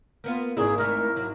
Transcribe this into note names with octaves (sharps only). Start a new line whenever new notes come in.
A#3 B3 F4
G#1 A#3 D4 E4 G#4
G#3 A3 A#4
F#3